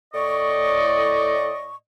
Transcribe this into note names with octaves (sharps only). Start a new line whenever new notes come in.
A2 D5 D#5 C#6